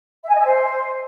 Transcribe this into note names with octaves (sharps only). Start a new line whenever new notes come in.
E5
G#5
D#5
E5
C5